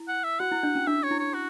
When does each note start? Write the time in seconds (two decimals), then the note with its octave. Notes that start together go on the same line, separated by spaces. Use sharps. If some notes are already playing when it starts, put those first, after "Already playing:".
Already playing: E4
0.08 F#5
0.24 E5
0.40 F#4 F#5
0.52 E4
0.63 D4
0.75 C#4
0.87 D4 E5
1.03 C#5
1.11 E4
1.19 C#5
1.34 F#4